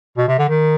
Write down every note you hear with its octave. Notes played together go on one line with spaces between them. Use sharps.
B2
C3
D3
D#3